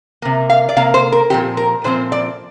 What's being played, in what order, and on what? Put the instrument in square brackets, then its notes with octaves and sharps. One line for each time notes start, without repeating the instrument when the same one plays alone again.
[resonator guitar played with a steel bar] C3 A#3
F5
D5
C3 A#3 F5
C5
A#4
A#2 F3 C4 G4
A#4
A#2 F3 C4 C5
D5